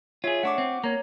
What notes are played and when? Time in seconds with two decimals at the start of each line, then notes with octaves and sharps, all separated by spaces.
0.24 F4 G#4 C#5 E5
0.43 A3 D4 F#5 C#6 D6
0.58 C4
0.84 A#3 C#5 A#5